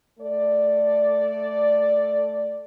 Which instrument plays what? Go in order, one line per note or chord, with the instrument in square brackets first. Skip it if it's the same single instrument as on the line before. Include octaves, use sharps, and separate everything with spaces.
[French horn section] A3 A4 D5